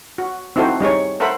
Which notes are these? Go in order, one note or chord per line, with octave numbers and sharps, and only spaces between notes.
F#4
C4 D#4 E4 F#4 A4 C5
G3 D#4 G#4 C#5
A4 A#4 C5 E5 F#5 B5